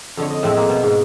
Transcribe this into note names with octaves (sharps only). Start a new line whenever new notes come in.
F2 D3 C#5
D#5
A2 F3 G#3 C4 C#5 A5
A#3
B2
G#2